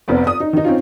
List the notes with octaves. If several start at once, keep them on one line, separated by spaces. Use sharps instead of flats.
F1 B3 C4 D5
D5 D#6
D#4
D#3 D#4
C4 C#4 D#4 F4